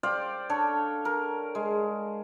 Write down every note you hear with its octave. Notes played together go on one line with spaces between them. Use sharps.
C5 D5 F5 G5
D4 A4 C#5
A#4
G#3